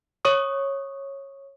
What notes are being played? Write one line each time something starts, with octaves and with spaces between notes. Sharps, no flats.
C#5 C#6 D#6